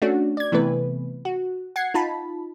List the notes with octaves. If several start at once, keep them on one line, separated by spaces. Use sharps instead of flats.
A3 C#4 D4 F#4
D5 G#6
C3 E3 A3 B3 B4
F#4
F#5 G#6 C7 C#7
D#4 F4 A5 B5